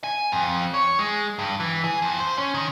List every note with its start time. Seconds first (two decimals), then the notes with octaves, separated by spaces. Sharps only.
0.04 G#5
0.32 F2
0.74 C#5
0.99 G#3
1.39 G2
1.60 E3
1.84 G#4
2.02 F2
2.20 C5
2.38 C#4
2.54 D#3